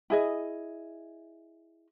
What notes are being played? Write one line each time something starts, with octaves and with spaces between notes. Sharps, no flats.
E4 G#4 D#5